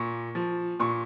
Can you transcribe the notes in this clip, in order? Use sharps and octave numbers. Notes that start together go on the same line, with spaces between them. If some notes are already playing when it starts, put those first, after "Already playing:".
Already playing: A#2 C#6
F3
A#2 C#6